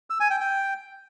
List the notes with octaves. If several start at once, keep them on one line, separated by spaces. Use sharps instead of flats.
E6
G#5
G5
G5